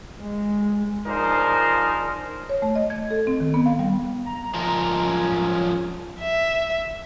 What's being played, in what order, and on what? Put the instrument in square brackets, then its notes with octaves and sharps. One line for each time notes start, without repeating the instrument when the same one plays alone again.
[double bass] G#3
[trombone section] F3 D4 D#4 G#4 A#4 C5
[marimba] C#5
A3
D#5
G#6
A4
C4
D#3
B3
F5
G3
[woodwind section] A#5
[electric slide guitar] F3 G#3 A#4
[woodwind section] F#3 C#4
[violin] E5